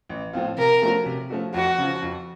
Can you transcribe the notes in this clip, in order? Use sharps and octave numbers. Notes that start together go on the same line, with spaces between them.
A1
A2 F3 C4 F4
C3 A#4
F3 A3 C#4 F#4
C3
F3 A3 C#4 F#4
F2 F#4
C#3 F3
F2